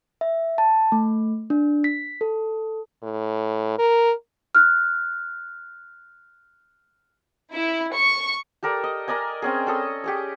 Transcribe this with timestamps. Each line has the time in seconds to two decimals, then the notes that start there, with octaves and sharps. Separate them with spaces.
0.21 E5
0.58 A5
0.92 A3
1.50 D4
1.84 B6
2.21 A4
3.03 A2
3.79 A#4
4.55 F6 F#6
7.54 E4
7.94 C#6
8.63 G4 A4 A#4 D5
8.84 D#5
9.08 A#4 D5 D#5 G#5
9.42 C4 C#4 G#4
9.67 C#4 A4 D#5
10.04 G4 G#4 C#5